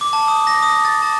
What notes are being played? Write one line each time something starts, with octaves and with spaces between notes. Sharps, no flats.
D6
A5
D#6
A#6
D#6
A6
A5